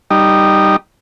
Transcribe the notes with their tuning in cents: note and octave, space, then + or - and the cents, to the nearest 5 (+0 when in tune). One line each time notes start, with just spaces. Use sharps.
G3 -5 D#4 -15